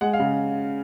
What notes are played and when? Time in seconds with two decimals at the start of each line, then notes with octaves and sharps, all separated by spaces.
0.01 G#3 F#5
0.13 F5
0.20 C#3